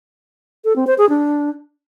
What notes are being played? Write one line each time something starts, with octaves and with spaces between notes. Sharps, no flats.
A4
C4
C5
G#4
D4